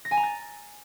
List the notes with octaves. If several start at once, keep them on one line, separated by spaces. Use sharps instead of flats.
A#6
G#5
A#5
A6